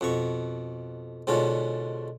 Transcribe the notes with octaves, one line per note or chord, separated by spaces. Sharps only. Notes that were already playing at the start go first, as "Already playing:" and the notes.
F2 B2 C#6
G#2 B2 D3 C#4 F4